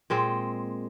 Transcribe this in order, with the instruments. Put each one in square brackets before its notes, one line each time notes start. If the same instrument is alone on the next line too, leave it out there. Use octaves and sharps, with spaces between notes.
[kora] A#2 G#3 C4